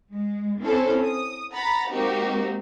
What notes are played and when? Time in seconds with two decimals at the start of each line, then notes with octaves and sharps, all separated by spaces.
0.12 G#3
0.61 C4 C#4 E4 A4 C5
1.02 D#6
1.53 F#5 A#5 B5 A6
1.91 G#3 A#3 C4 D#4 F#4 G4